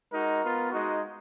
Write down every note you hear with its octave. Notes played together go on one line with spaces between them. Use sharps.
G#3 D#4 F#4 A#4
B3 F4
G#3 D#4 F#4